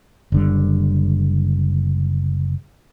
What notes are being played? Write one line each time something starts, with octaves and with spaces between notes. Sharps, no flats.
F#1 D3 G3